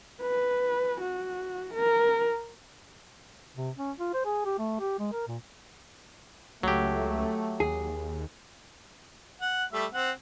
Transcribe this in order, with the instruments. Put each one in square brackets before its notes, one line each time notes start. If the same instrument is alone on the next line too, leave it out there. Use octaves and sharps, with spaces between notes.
[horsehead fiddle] B4
F#4
A#4
[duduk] C3
C#4
F4
C5
G#4
G4
A3
G4
G#3
A#4
A#2
[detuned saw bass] C#2 [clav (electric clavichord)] F#3 G4 [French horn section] A3
[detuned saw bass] D#2 [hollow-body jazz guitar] G#4
[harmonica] F#5
G3 A3 E5
C4 F#5